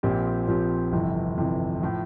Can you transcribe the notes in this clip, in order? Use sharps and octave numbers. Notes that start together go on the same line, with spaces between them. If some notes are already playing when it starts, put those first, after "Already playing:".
A#1 A#2 F3 C4 G4
A#1 A#2 F3 C4 G4
G1 F2 C3 E3
G1 F2 C3 E3
A2 F3